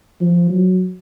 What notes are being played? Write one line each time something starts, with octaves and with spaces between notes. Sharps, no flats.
F3
F#3